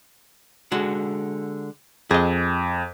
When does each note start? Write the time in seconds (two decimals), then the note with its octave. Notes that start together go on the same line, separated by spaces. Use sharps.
0.72 D3 G#3 F#4
2.11 F2 G#4 D#5